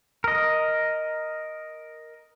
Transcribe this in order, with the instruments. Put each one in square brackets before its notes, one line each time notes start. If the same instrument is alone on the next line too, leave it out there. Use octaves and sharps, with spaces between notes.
[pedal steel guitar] A#4 D#5